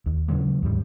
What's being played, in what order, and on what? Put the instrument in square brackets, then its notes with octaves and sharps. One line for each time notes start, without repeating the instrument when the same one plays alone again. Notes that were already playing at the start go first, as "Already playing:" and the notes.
[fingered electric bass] D#2
C#3 E3 F#3 G#3
D#2 G#2 G3